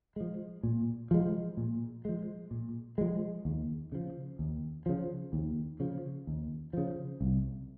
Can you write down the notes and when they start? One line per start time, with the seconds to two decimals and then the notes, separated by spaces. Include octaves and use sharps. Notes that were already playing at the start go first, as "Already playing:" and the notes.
0.16 F3 G#3
0.63 A#2
1.11 F3 G#3
1.57 A#2
2.05 F3 G#3
2.51 A#2
2.98 F3 G#3
3.45 D#2
3.92 C#3 F3
4.39 D#2
4.86 C#3 F3
5.33 D#2
5.80 C#3 F3
6.27 D#2
6.73 C#3 F3
7.21 C2